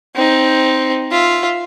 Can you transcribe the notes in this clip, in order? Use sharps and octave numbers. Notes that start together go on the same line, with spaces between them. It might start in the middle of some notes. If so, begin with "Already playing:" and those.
C4 D#4
F4 E5